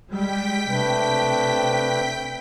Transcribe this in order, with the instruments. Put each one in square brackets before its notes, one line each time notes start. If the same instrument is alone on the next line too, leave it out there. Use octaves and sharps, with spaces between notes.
[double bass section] G3 G#3 [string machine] G5 B6
[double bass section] C3 [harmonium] A3 D4 B4